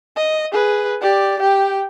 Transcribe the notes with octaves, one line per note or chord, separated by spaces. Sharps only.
D#5
G#4 B4
G4 D5
G4 G5